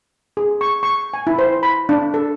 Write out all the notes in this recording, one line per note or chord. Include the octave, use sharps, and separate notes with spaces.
G#4
C#6
C#6
G#5
E4
C5
B5
D4
A4